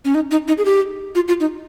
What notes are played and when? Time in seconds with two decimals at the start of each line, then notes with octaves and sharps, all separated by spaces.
0.05 C#4
0.15 D#4
0.31 D#4
0.48 D#4
0.58 G#4
0.65 G4
1.15 F4
1.28 F4
1.40 D#4